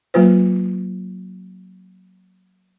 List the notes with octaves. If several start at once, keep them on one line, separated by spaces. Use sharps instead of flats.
F#3 A#3 F4 B4 C5